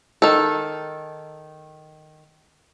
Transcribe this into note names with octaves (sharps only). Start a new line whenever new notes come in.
D#3 A4